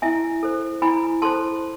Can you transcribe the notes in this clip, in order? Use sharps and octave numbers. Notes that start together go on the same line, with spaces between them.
E4 E5 G#5
A4 C5
E4 G#5 B5
A4 C5 A5 C6